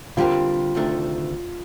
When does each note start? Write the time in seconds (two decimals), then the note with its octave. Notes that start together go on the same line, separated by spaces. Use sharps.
0.17 D3 G3 C4 F4 G4 A#4
0.75 D2 C3 D#3 A3 D4